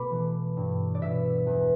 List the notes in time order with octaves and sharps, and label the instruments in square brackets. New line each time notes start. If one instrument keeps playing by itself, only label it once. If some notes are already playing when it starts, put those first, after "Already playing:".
Already playing: [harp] B2 A3 A5 B5 D6
E3
G2
D5
B2 E5
E2